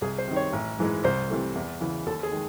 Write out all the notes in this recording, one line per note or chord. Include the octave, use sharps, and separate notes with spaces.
C2 G#4
C5
C3 D#3
C#5
A1
G#2 E3 G#3
C2 C5
C3 E3 A3
E2
C#3 E3
D#2 A4
G#4
D#3 G#3